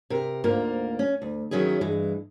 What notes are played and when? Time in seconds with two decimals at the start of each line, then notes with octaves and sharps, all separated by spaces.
0.10 C3 A#4
0.44 D2 G#2 A#3 F4 A#4
0.99 C#4
1.22 D2
1.51 D#3 F#3 C#4 E4 G#4
1.81 G2 E3 G#3